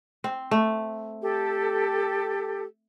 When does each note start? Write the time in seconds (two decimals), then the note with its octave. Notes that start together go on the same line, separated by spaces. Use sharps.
0.24 C4
0.51 A3
1.22 G4 A4